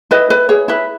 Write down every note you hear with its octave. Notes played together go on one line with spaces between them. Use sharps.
E4 B4 D#5
E4 B4
G#4 C#5
E4 B4